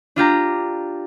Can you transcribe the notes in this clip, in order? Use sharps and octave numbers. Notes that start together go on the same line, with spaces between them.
D4 F4 G4 A#5